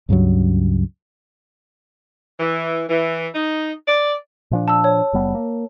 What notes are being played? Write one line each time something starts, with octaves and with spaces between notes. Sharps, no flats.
C#2 G2 C#3 F#3
E3
E3
D#4
D5
A#2 F3 D4
A5 E6
C#5
F#1 G3 B3
A#3